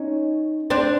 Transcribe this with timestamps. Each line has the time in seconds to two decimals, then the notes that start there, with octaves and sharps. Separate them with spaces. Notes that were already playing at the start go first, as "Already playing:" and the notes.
Already playing: C#4 D#4
0.70 C4 D4